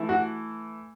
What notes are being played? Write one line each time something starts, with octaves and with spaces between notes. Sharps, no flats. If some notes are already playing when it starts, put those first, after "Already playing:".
Already playing: E3 A3 E4
F#4